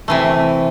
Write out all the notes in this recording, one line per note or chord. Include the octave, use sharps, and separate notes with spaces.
C3 E3 A3